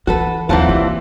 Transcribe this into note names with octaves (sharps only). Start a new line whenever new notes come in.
E3 F#4 A4 B4
D#2 E3 F#3 C4 F4 F#5 A5
C2 A#3 G4